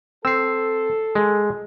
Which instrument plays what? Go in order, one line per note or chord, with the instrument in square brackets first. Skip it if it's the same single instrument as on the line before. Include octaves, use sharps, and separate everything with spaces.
[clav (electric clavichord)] C4 [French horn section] A4 [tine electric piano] E6 C7
[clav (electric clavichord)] G#3